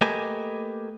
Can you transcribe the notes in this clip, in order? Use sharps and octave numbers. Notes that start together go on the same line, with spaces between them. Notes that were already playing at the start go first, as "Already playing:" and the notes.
A3 A#3 G4 B4 D#5 G#5